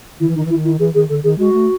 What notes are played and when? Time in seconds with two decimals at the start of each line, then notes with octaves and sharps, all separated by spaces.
0.20 D#3 E4
0.28 E3
0.35 D#3 D#4
0.45 E3
0.50 E4
0.54 D#3
0.64 E4
0.79 E3 G#4
0.94 D#3 G#4
1.09 D3 A4
1.23 D#3 G#4
1.39 G#3 F#4
1.53 A3